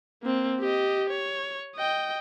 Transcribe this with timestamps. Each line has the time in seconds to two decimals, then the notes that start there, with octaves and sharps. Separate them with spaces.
0.23 A#3 C4
0.60 G4 D#5
1.09 C#5
1.76 D#5 G5